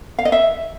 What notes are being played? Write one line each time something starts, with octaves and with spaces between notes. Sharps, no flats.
F5
D#5
E5